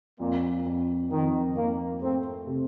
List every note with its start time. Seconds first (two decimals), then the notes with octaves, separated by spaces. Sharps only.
0.20 F2 A#2
0.65 F2
1.11 F2 D#3
1.56 F2 A#3
2.01 A3 C4
2.47 C3